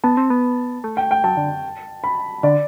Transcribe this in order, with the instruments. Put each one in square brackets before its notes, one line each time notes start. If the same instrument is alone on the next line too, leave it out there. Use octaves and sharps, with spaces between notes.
[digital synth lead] B3 [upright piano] A5
[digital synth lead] C4
B3
A3
[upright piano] G5
G5
[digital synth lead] F#3 [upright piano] A5
[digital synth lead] D3
[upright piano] B5
[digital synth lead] D3 [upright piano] D5